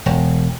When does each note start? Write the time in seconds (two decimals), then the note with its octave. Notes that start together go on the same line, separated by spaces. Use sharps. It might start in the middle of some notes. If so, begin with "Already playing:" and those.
0.06 E1